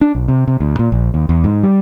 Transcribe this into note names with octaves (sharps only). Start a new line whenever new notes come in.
D4
B1
C3
C3
D2
A#2
A#1
D#2
E2
G#2
G3